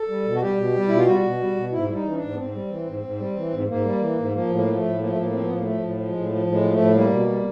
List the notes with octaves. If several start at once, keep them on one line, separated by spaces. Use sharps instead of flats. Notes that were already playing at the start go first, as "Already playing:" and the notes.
Already playing: A4
G3
B2
F#4
G3 G4
B2
G3
B2 E4
F4
G3 F#4
B2
G3
B2
G#2 E4
G3 E4
D#4
E3
C#4
G#2 D4
B3
G#2 C4
G3
E3
G#2
G#2
G3
E3
G#2
G#2 A#3
G3
E3
G#2
F3 A#3
A2 A#3
F3
A2 A3
F3 A#3
A3
A2 A#3
F3 C4
A2 B3
A#3
F3 A3
A2
F3
G#3
A2
F3
A2
G#3
F3
A3
A2
G3 A#3
B2
G3